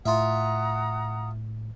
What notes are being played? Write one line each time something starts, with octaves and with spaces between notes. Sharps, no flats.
A2 F4 E5 F#5 A#5 D#6